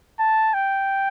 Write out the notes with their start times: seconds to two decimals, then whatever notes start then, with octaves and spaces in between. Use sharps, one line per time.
0.20 A5
0.54 G5